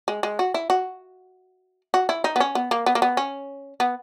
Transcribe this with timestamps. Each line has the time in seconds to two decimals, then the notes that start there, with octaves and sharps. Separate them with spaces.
0.08 G#3
0.23 G#3
0.39 F#4
0.54 E4
0.70 F#4
1.94 F#4
2.09 E4
2.24 D#4
2.36 B3
2.40 C#4
2.55 B3
2.71 A#3
2.86 B3
2.95 A#3
3.02 B3
3.17 C#4
3.80 B3